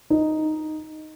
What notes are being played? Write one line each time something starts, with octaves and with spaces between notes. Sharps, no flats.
D#4